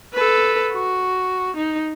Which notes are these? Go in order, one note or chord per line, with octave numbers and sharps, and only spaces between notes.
A4 B4
F#4
D#4